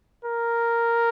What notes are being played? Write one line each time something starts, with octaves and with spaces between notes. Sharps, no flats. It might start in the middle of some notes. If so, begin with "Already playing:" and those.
A#4